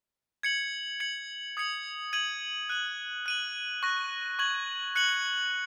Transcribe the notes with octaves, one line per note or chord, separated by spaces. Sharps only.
G#6 C#7 F#7
G#6 C#7 F#7
D#6 G#6 C#7 F#7
G#6 D#7 F#7
F#6 D#7 F#7
F#6 D#7 F#7
C#6 F#6 A#6
C#6 G#6 F#7
F#6 C#7 F#7